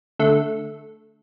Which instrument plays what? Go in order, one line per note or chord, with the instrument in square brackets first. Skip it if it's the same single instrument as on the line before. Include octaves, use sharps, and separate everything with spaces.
[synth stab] D3 A3